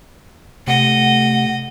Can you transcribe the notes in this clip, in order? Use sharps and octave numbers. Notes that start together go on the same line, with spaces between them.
C3 A3 D#5 F#5